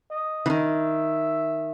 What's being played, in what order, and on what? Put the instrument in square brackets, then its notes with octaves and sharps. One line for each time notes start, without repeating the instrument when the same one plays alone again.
[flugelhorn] D#5
[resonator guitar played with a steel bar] E3
[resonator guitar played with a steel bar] D#3 [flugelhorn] E5